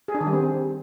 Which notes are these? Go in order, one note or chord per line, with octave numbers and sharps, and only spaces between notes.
G#4
D4
D#3
G3
C4